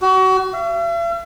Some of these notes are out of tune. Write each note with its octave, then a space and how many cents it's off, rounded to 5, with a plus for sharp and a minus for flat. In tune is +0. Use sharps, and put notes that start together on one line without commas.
F#4 +30
E5 +45